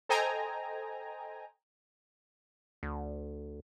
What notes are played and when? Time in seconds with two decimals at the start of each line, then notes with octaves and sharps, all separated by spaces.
0.09 A4 C5 D#5 G5 G#5 A#5
2.83 D2